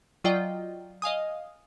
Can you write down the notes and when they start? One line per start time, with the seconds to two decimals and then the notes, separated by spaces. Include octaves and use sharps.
0.24 F#3 F4 D5 D#5 G5
1.02 D#5 F5 G#5 D#6